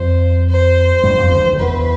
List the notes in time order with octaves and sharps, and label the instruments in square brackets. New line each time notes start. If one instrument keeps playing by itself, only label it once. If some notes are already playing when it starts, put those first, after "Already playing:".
Already playing: [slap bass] F2 F3 [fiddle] C5
[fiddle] C5
[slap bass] G2 G3
F2 F3
D2 D3
E3
D3
[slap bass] E2 E3 [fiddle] B4